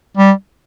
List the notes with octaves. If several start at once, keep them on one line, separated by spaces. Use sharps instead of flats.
G3